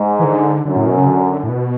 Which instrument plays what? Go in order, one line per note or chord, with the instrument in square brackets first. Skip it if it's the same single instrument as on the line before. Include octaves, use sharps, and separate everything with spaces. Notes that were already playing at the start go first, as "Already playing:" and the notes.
Already playing: [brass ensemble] G#2
[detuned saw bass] E3
D3
[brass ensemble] F#2 [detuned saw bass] D3
[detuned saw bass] A2
B2
C#3
D3
A2
B2